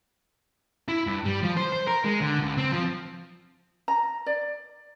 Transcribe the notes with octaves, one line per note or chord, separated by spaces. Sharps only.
E4
G2
G3
F3
C5
C5
A#4
G#3
D3
C#2
C4
F3
A#5
D5